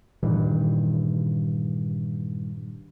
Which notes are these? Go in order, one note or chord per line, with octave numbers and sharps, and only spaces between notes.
G2 A#2 D#3 E3